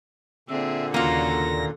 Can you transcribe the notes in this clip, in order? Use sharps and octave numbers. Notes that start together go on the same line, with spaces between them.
A#2 D3 C4 G#4 E5
D#2 C#3 A#3 F4 F#4 A4 A#6